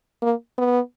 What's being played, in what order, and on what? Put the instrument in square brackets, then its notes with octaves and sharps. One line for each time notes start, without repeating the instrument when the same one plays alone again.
[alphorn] A#3
B3